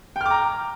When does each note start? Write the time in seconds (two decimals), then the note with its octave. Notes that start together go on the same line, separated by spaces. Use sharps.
0.16 G5
0.21 F6
0.26 D6
0.30 A#5